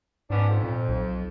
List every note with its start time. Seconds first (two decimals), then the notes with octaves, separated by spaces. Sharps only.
0.30 G#2 B3 C#4 D4
0.47 F2
0.64 A#2
0.89 B1